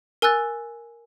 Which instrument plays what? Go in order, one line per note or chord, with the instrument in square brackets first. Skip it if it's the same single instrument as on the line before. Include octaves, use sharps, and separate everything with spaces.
[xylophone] A#4 G#5 E6 F#6 A6